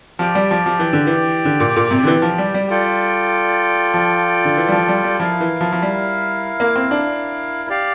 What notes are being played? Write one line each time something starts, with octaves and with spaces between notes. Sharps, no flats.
F3 G4 D5 G5
G3
F3
F3
E3
D3
E3
D3
A#2
A#2
C3
D3
E3
F3
G3
G3
F4 A4 D5 G5
F3
D3
E3
G3
F3
G3
G3
F3 E4 A#4 F5
E3
F3
F3
G3
A#3
C4
D4
G4 D5 F5